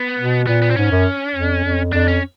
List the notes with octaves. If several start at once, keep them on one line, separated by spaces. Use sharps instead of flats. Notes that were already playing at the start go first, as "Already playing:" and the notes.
Already playing: B3
B2
A#2 B3
B3
C4
G#2 C#4
F#2
F2
F2
F2 D4
C#4